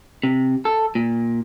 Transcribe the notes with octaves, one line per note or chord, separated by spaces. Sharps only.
C3
A4
A#2